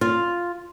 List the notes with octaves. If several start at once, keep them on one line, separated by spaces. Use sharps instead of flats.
F4